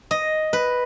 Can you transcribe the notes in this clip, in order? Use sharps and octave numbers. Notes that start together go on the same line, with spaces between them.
D#5
B4